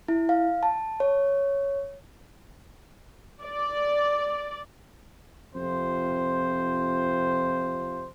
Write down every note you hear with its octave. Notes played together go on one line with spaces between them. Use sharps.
E4
F5
A5
C#5
D5
F2 C3 F4 C5